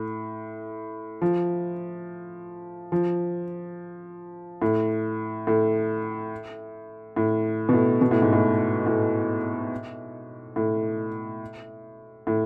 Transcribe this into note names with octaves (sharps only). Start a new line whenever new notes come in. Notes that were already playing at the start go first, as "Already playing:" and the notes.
Already playing: A2
F3
F3
A2
A2
A2
B2
A2
B2
A2
G#2
A2
A2
A2
A2